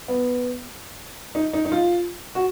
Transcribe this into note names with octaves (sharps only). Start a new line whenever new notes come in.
B3
D#4
D#4
D#4
F4
F#4